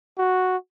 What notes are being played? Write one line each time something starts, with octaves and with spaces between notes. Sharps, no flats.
F#4